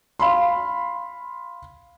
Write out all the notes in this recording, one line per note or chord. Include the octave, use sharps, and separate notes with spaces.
F5 B5 C6